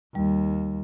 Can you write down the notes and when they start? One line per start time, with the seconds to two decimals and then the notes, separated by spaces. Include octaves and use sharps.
0.15 D#2 G3